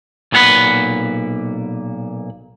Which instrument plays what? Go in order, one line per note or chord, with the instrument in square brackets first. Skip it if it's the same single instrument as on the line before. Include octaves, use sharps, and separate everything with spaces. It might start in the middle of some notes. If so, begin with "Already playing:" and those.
[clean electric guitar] B1 A#2 C#4 G#4 F#5 B5